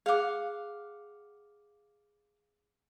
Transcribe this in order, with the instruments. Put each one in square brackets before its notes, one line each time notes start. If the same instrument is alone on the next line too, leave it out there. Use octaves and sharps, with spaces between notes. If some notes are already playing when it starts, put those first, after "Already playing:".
[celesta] G#4 D6 [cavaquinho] F5 F#5